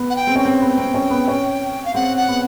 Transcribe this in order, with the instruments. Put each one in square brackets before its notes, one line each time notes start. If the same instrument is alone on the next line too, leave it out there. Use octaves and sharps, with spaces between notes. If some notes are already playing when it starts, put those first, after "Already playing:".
Already playing: [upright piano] B3
[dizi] F#5
G5
[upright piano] C4
[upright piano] C#4 [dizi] G5
[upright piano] C4
B3
C4
C#4
B3
C#4
[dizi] F5
[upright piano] C4 [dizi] F#5
[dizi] F#5
[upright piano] B3